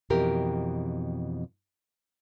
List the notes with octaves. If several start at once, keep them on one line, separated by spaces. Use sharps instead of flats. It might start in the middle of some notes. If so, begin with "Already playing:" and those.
F2 B2 E3 G4 A#4 G5